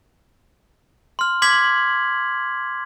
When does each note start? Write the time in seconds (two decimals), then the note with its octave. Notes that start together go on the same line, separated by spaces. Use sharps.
1.19 C6 F6
1.42 C6 D6 G#6 B6 F#7